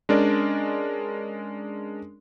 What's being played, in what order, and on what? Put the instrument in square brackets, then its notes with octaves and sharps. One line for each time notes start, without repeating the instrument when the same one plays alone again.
[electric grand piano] G#3 C#4 D4 A#4 D5